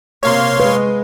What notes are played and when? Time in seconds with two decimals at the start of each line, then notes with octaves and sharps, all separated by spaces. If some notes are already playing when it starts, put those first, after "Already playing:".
0.23 C3 A#3 C#5 F5 C6
0.60 G#3 B4